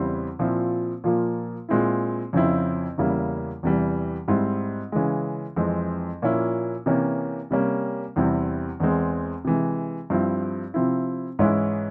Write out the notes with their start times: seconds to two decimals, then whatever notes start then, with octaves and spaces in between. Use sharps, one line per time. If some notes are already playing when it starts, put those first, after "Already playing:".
Already playing: E2 C#3 G3 C4 E4
0.39 A#2 F3 C4 E4
1.04 A#2 F3 A#3
1.69 A#2 G#3 C4 E4
2.33 F2 C#3 F3 C4 E4
2.98 E2 C#3 G3 A#3 E4
3.63 E2 C3 E3 G3
4.28 G#2 G3 C4 E4
4.92 C#3 E3 G#3
5.56 F2 E3 G#3 C4
6.22 A#2 F3 A#3 C#4 E4
6.86 C3 E3 A#3 C#4
7.51 C3 G3 A#3 C#4
8.16 E2 C3 G3 C4 E4
8.80 E2 E3 G#3 C4
9.45 C3 E3 G#3
10.10 G2 F3 C4 E4
10.74 C3 F3 C4 E4
11.39 G#2 E3 G#3 C#4 E4